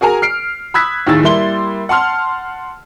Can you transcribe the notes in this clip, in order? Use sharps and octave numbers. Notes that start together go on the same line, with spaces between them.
F#4 G#4 A#4 G#5 A#5
F6 C7 D7
B5 D#6 E6 F#6 G#6 B6
D#2 A2 D#3 G#4 E6 A6
G3 A#3 E4 C6 G7
F#5 A5 C6 F6